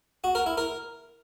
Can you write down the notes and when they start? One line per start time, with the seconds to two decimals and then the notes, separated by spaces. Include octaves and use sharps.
0.24 F#4
0.35 A#4
0.46 E4
0.58 A#4